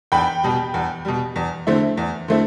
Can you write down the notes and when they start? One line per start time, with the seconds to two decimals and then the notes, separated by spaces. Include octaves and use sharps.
0.12 E2 G5 B5
0.43 B2 G3
0.74 E2
1.05 B2 G3
1.36 E2
1.67 D3 A3 C4 E4
1.97 E2
2.28 D3 A3 C4 E4